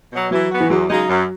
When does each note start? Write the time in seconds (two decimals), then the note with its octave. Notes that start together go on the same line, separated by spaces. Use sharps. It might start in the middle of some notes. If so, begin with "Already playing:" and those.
0.13 B2 F#3
0.31 E3 F#3
0.51 B3 F#4
0.60 E3
0.70 E2 F#3
0.90 C#3 F#3 G#3 D#4
1.09 F#2